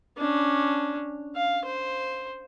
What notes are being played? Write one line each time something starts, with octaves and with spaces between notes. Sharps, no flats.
C#4 D4
F5
C5